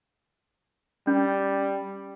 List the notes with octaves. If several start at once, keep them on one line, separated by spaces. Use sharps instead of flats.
G3 C#4